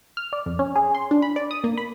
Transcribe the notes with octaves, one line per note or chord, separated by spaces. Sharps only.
F6
D5
F2
C#4
G#4
C6
D4
B5
D5
D#6
A#3
B5